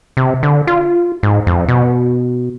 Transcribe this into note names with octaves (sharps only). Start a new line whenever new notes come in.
C3
D3
F4
G#2
F2
B2